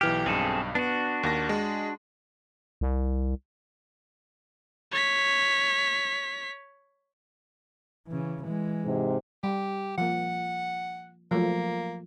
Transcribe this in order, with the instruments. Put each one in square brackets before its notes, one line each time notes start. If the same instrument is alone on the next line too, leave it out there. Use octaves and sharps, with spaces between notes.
[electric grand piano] B1 E3 F6 [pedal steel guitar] G4
[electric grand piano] B1 G2 [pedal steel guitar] C4 G#4 A4
[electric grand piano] B3 [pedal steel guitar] D4 F#4
[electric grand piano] D#2 A#3 A#6
G#3
[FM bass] C2
[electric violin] C#5 B6
[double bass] C#3 E3
E3 G#3
[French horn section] G#2 C3
[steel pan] G3 [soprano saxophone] G4
[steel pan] F3 A#3 [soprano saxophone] F#5
[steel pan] F3 F#3 A3 [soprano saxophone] A#3